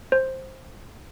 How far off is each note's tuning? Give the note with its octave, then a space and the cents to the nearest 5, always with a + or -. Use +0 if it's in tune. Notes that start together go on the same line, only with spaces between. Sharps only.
C5 +10